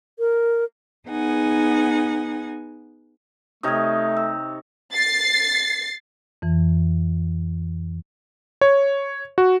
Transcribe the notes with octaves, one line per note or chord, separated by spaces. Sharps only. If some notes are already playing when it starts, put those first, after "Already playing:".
A#4
B3 D#4 G#4 F#5 G#5
C3 A3 D#4 C#5 D#6 F6 G#6
E6
A6 C7
F2 E3
C#5
F#4